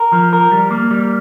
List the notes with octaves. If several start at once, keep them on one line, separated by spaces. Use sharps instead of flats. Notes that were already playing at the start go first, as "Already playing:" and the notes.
Already playing: A#4
F3
A#4
G3
A#3
G3